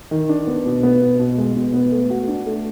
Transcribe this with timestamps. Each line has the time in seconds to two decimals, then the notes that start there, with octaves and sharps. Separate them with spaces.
0.11 D#3
0.29 D4
0.47 B3
0.65 B2
0.83 B3
1.01 B2
1.19 B2
1.38 G#3
1.56 B2
1.74 B3
1.92 A3
2.10 F#4
2.28 D4
2.46 A3